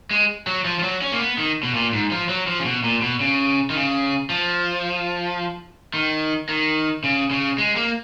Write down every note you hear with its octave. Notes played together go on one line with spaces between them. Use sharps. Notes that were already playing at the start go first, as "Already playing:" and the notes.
G#3
F#3
F3
F3
F#3
C#4
A#3
B3
D#3
B2
A#2
G#2
F3
F#3
F3
C#3
B2
A#2
B2
C#3
D#3
C#3
F3
D#3
D#3
C#3
C#3
G#3
A#3